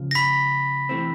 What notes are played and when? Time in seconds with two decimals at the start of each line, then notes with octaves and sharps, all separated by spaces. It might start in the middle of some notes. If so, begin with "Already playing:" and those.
Already playing: C#2 C#3 F3
0.11 A#6
0.15 B5 B6
0.89 C3 E3 A3 C4